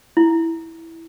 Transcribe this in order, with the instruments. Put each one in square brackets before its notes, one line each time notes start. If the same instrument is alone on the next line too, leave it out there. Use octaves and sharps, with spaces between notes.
[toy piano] E4